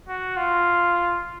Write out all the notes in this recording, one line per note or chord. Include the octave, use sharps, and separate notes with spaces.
F#4
F4